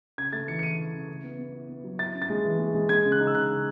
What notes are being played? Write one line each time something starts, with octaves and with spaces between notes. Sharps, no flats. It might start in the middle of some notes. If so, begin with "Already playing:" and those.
C#3 G#6
A3 A6
E3 C#7
C#7
E3 D#7
E3
C#3
E4
B3
B3
E4
B3
F#3
E4 A6
C#4
A6
G#3
E3
G#3
G#3
G#3 G#6
C#3
F#6
D#4
E6
C#3 F#6
C#3